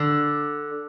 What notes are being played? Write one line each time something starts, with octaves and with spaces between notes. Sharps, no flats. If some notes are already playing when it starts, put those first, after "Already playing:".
Already playing: D3